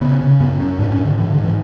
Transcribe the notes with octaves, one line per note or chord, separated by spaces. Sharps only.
C#3 B3
C#3
F#2 B3
F#2 C#4
G#2 D4
C#4
G#2
D3
G#2 E3
D3
G#2
E3